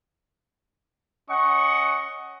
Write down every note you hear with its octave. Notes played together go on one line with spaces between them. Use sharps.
C#4 D#5 F#5 C#6